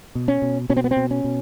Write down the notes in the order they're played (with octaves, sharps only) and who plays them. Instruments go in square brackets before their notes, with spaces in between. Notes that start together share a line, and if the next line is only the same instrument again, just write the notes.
[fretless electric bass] B2
C#4
B2
B2 C#4
C4
B3
C4
B2
C#4
B2